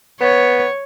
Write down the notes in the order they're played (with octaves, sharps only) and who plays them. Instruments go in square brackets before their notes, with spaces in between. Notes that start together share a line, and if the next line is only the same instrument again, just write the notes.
[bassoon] B3 [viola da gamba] C#5